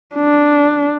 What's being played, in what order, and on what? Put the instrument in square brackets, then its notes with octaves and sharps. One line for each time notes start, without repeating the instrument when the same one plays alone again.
[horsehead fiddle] D4